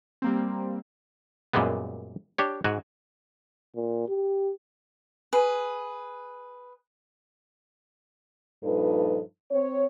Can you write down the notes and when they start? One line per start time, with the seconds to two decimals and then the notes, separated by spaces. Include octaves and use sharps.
0.22 G3 A#3 C4
1.53 F#2 A#2 G3 G#3 B3
2.38 D4 G4 C#5
2.64 G#2 F#4 G#5
3.76 A#2
4.09 G4
5.33 G#4 B4
8.63 G2 A#2 F3 D#4 A4 B4
9.52 C4 C#5